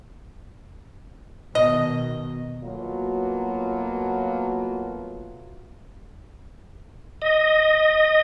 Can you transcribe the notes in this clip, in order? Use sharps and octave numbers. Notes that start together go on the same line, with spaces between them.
B2 D#3 D#5
B2 F#3 A3 A#3 F4 F#4
D#5